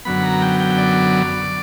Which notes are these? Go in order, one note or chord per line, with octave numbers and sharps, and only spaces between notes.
F#2 D3 F#3 B3 B5
A#5
G5
G5
D5